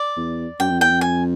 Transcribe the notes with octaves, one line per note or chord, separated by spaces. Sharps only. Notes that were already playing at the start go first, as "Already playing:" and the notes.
Already playing: D5
E2
F#2 G5
F2
E2 G5
F2
G#5